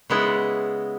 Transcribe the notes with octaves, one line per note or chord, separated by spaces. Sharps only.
C#3 G#3 B3 E4